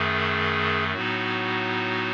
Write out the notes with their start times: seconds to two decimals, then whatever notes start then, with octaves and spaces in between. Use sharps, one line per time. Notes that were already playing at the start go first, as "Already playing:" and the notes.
Already playing: F#2 D#3 A3 G#4
0.94 A2 F#3 B3 D#4 F#4